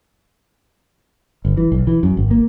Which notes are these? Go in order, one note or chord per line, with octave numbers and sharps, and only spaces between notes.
G1
E3
B1
E3
F#2
G#1
A#3